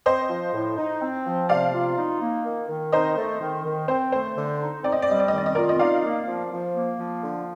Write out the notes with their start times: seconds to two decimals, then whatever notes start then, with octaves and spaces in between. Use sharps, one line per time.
0.06 C4 C5 D#5
0.29 F3
0.54 A2
0.77 D#4
1.01 C4
1.26 F3
1.49 C3 D5 F5
1.73 F4
1.97 D#4
2.21 A#3
2.45 D#3
2.69 D#3
2.92 D#4 C5 D#5
3.17 A3
3.40 D#3
3.65 D#3
3.88 C4 C5
4.12 A3 C5
4.36 D3
4.60 D#4
4.83 C4 D5
4.92 D#5
5.02 D5
5.08 G3 D#5
5.20 D5
5.28 D#5
5.32 D#3
5.38 D5
5.46 D#5
5.55 F4 A#4 D5
5.69 D#5
5.79 D#4 D5 F5
6.04 A#3
6.27 F3
6.52 F3
6.75 A#3
6.99 F3
7.23 D3